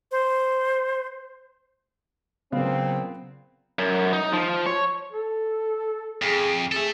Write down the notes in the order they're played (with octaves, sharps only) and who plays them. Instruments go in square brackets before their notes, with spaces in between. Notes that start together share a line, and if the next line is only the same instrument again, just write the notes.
[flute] C5
[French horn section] A#2 C4 [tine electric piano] C#3 F#3 [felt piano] B3 F5
[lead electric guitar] F#2
D#4
F3
C#5
[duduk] A4
[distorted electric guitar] F2 [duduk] G#4
[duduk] G#4 [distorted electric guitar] A4 E5